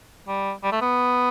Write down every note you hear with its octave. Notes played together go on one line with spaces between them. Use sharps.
G3
G3
A3
B3